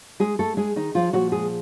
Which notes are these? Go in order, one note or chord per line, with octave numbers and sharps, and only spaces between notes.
G#3 G#4
A3 A4
G#3 G#4
D#3 D#4
F3 F4
A#2 F3 F#3 F#4
G#3 G#4